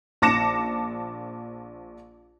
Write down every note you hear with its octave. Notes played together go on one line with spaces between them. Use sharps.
A#1 A5 D6 A#6 C#7 E7